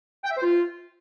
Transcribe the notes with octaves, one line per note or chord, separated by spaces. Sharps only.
G5
E5
C5
F4